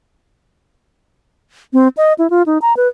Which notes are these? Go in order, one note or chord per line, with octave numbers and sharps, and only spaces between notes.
C4
D#5
E4
F4
D#4
A#5
B4